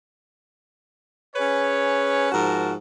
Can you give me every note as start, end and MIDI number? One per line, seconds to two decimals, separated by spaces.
1.36 2.29 61
1.36 2.29 68
1.36 2.29 71
1.36 2.29 73
2.32 2.74 44
2.32 2.74 53
2.32 2.74 66
2.32 2.74 70
2.32 2.74 81